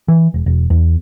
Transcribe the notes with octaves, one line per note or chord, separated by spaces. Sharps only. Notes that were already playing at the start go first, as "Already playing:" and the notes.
E3
E1
E1
E2